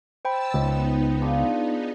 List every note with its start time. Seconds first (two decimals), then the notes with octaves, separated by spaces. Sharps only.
0.25 C5 G5 A5 B5 E6
0.54 C#2 B3 D#4
1.21 D4 F4 G#4